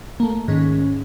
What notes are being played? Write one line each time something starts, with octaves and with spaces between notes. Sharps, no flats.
A3 A#3
G#2 D#3 C#4